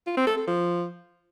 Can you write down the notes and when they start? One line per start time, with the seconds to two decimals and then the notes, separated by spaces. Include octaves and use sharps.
0.07 F4
0.17 C4
0.27 A4
0.37 A4
0.47 F3